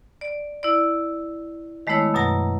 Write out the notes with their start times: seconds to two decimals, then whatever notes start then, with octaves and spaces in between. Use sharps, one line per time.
0.21 D5
0.63 E4 D5
1.87 D#3 G#3 A3 B3 E4 C#5
2.14 F#2 B2 F#3 A#5 A#6